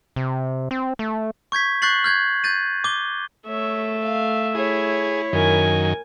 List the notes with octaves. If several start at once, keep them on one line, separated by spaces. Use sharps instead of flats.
C3
C4
A3
C#6 G6 G#6 B6
C#6 F#6 G6 A6 C7 F#7
F6 G6 G#6
G6 A6 D#7
D6 G7
A3 C#5 E5
F5
E4 G#4 C#5
F#2 D#3 A#4 G#5